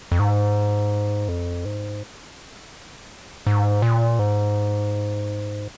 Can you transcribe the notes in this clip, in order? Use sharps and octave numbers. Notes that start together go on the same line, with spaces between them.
F2
G#2
F2
G#2
G#2
A#2
G#2